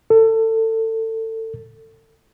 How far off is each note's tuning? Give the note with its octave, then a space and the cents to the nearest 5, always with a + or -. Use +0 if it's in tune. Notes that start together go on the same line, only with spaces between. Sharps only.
A4 +25